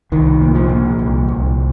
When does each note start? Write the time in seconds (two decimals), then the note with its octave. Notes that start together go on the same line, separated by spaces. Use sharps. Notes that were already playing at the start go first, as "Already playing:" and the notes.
0.12 C2 D#3
0.41 A#2
0.55 F3
0.69 A#2
0.99 C2
1.28 C2